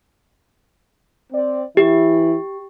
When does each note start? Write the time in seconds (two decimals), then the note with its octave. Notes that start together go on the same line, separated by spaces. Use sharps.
1.33 C4 D5
1.77 E3 E4 G4